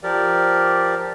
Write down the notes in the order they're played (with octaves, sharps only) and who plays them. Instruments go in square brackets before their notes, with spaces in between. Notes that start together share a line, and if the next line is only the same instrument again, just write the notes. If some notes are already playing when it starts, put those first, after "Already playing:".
[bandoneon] F3 G4 A#4 D5